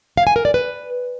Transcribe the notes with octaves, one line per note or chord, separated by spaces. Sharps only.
F5
G#5
A#4
D5
B4